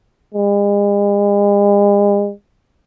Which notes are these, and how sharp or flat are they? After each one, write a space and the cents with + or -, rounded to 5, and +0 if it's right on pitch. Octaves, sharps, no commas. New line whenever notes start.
G#3 -40